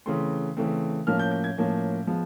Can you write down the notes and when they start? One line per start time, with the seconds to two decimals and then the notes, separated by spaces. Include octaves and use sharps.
0.06 C#3 E3 A3 C4 C6
0.57 C#3 E3 A3 C4
1.07 A2 F3 A#3 C#4 F6
1.20 G6
1.31 G6
1.44 G#6
1.57 A2 F3 A#3 C#4
2.07 F3 G#3 B3